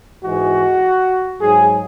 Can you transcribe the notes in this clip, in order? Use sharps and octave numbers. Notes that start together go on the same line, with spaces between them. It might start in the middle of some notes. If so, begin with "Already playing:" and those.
G#2 E3 G#3 F#4
G#2 F#3 G#4